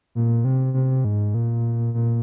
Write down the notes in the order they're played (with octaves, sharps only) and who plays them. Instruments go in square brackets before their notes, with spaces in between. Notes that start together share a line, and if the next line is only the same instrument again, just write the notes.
[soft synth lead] A#2
C3
C3
G#2
A#2
A#2